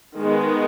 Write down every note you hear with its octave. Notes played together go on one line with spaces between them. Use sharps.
D#3 G#3 B3